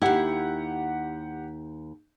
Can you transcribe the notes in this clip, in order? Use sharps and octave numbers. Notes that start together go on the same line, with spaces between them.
D#2 E4 G4 F#5